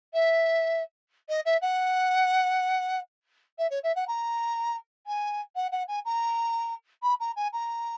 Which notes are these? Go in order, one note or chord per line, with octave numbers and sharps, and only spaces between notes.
E5
D#5
E5
F#5
E5
C#5
E5
F#5
A#5
G#5
F#5
F#5
G#5
A#5
B5
A#5
G#5
A#5